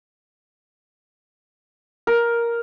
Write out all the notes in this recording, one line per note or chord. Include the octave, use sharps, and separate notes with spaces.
A#4